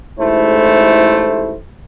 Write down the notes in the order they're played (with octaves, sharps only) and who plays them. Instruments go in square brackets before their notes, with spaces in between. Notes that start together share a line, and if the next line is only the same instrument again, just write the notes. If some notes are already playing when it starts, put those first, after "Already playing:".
[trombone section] A1 G#2 A3 E4 C5